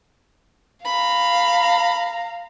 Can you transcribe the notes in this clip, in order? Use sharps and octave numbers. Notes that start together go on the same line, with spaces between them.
F5 A#5 B5